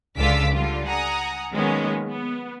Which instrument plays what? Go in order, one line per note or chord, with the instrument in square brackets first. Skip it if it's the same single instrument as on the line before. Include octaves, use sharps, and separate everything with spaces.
[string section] C#2 D3 F4 D6 E6 B6
D3 G3 F4
F#5 G#5 A#5 D#6
D#3 F#3 G#3 A#3 B3 C#4
B3